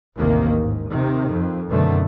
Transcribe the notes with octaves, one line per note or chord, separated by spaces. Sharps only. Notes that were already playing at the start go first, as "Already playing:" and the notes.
A1 D#2 C3 D#3 A#3
G#2
C3 D#3
F2
F#2 B2 D3 D#3 A3